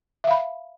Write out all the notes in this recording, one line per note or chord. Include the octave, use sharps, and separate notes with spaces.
E5 F5 B5